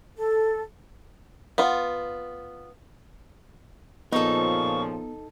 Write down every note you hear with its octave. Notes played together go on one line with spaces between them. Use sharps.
A4
B3 F4
A#2 C#3 F3 B3 D#4 A4 C#6